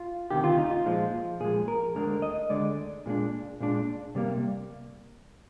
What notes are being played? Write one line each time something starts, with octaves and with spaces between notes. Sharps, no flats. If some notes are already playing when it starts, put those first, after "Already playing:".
Already playing: F4
D2 C3 D#3 G4
F4
D#4
F4
A#2 F3 G#3
A#2 F3 G#3 G#4
A#4
D2 D3 G#3 A#4
D#5
D2 D3 G#3 D5
A#2 G#3 D4
A#2 G#3 D4
C3 G3 A#3